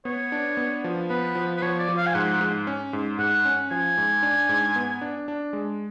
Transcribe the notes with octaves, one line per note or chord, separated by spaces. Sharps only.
B3 C#5
D4
B3
F3
B3 B4
F3
B4
F3 C#5
D5
F3
F5
G#5
G#2 F#5
G#2
C#4
G#2
G#2 F#5
C#4
F3 G#5
G#2
D4
G#2
B3
D4
D4
G#3